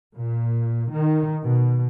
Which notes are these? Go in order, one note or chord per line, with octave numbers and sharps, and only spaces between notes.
A#2
D#3
B2